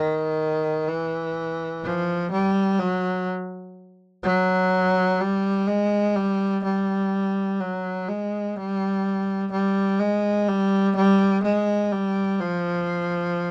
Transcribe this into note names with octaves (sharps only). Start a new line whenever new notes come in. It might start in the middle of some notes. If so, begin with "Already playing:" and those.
Already playing: D#3
E3
F3
G3
F#3
F#3
G3
G#3
G3
G3
F#3
G#3
G3
G3
G#3
G3
G3
G#3
G3
F3